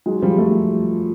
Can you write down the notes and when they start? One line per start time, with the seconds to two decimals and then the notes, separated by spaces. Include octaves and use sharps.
0.06 F#3 G#3
0.22 F3 G3
0.38 G3 A3